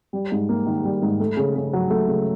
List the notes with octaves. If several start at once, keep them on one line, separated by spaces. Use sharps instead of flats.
G3
G#2
A#3
D#3
G3
G#2
A3
C#3
C#3
F#3
A3
C#3